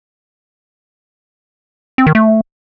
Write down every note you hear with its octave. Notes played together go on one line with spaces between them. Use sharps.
C4
D#3
A3